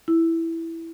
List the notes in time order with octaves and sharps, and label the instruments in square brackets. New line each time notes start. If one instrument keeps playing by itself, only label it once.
[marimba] E4